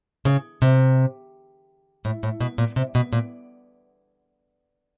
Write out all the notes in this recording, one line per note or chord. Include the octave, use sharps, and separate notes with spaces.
C#3
C3
A2
A2
B2
A#2
C3
B2
A#2